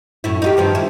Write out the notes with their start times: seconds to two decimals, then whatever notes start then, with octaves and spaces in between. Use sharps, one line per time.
0.24 F#2 A2 E4
0.42 D#4 F4 G4
0.57 G2 D#3 F3
0.75 E4